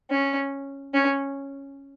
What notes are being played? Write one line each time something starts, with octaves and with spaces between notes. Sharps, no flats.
C#4
C#4